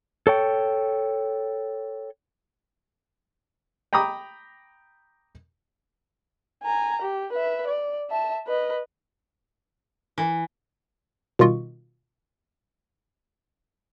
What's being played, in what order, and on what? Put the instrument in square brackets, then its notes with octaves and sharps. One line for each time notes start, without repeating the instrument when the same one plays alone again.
[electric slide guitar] A4 C#5 G5
[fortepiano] G5 A#5 B5 D6 D#6
[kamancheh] G#5 A#5
G4
B4 E5
D5
E5 A5
B4 D#5
[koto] E3
[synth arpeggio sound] B2 D#3 G3 F4 D#5 C#6